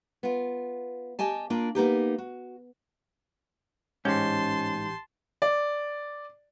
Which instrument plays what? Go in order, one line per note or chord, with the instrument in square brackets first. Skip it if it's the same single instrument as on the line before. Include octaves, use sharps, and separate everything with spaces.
[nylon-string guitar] B3 F4
G4 D#5 G#5 A5
A#3 D4 F4
A#3 B3 D#4 G4
F#4
[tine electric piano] A1 G4 G6 [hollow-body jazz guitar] G#2 [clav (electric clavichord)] C#4 [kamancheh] A5 C6
[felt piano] D5